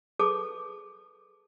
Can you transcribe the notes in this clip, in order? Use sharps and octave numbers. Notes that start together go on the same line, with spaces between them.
G#4 A4 B4 C#5 A5 D6